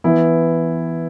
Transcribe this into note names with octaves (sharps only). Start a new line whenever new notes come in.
E3 B3 E4